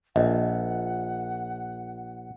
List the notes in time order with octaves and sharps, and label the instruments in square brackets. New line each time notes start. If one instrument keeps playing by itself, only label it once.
[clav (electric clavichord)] A#1 [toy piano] D#5 [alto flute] F#5